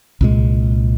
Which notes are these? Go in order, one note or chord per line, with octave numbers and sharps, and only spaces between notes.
C2 A#2 G#3